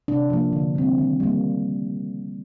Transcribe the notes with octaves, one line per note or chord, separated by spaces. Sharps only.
C3 D4
F3 A#3
D3
G3 C4
D#3
G3 A#3